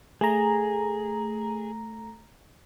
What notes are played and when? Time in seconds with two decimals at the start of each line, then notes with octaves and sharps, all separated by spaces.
0.21 A3 G#4 A#5